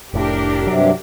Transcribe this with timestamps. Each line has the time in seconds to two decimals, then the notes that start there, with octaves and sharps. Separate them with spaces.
0.14 F1 A2 D4 G4 A#4
0.67 G2 C3 F#3